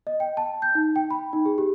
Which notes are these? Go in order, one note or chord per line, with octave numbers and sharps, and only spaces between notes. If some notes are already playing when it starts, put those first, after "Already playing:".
D#5
G5
A5
G6
D#4
G5
B5
D#4
G#4
G4